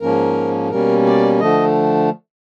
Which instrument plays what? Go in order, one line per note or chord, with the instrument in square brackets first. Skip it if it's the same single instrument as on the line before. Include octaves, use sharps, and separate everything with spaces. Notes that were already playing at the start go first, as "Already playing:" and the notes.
[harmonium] G#2 F3 A#3 C#4 A#4
B2 G3 A#3 C#4 A#4
D5
D3 F3 A3 D#5